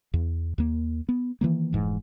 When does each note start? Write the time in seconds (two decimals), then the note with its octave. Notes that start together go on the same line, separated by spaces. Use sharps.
0.14 E2
0.58 D#2 A#3
1.09 B3
1.41 D#3 E3 F#3 A#3
1.73 F1 G#2 E3